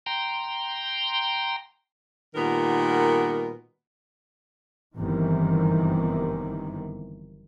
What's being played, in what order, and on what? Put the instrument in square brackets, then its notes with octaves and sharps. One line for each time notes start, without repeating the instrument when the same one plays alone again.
[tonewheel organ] G5 A#5 C6
[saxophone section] A#2 D#3 G3 B3 F#4 A#4
[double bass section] G1 F#2 C3 D#3 E3